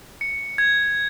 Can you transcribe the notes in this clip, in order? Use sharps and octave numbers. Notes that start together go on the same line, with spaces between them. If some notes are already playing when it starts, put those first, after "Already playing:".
C#7
G#6